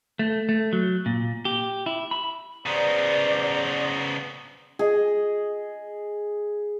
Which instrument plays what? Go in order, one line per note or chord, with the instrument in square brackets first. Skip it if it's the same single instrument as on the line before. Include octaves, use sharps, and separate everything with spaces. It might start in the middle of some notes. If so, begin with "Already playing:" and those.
[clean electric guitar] A3
A3
F#3
A#2
G4
E4
B5
[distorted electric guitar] C#3 B3 [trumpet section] C#4 C5 A#5 [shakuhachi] D5
[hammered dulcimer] G#4 D#5